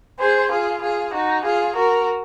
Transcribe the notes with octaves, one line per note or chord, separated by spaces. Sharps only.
G#4 C5
F4 G#4
F4 G#4
D#4 F#4
F4 G#4
F#4 A#4